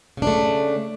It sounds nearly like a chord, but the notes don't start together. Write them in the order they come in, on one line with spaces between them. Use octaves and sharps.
C#3 D4 A3